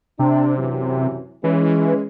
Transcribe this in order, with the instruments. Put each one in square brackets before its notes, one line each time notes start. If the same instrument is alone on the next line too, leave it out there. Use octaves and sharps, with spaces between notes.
[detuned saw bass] C3 [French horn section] D4
[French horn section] F#2 E3 F#3
[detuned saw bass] E3 [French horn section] G#3 C#4